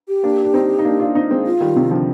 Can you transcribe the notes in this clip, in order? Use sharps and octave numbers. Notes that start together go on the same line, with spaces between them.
G4
A#3 D4
D4
C4 D#4
D#4
A#3 D4
D4 F4
C4 D#4
G#3 C4
F4
D#3 G3
C3 D#3
D3 F3